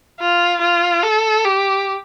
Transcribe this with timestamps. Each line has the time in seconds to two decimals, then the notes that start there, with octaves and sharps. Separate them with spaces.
0.20 F4
0.62 F4
1.03 A4
1.45 G4